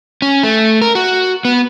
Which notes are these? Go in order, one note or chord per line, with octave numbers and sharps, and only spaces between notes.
C#4
A3
A#4
F#4
B3